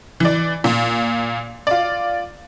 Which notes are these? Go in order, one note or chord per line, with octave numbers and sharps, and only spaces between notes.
E3 D5
A#2
F4 D5